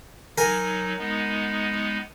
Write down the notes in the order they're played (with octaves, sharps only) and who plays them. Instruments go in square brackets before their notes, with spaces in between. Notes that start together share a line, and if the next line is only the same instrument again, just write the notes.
[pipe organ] F#3 D#4 [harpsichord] A#4 G#5
[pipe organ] G#3 B3 D#4